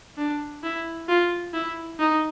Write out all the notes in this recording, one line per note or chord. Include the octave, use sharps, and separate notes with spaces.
D4
E4
F4
E4
D#4